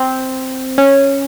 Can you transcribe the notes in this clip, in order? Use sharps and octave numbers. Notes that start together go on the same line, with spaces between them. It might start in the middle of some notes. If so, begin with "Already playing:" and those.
Already playing: C4
C#4